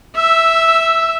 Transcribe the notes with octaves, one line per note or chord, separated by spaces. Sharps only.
E5 E6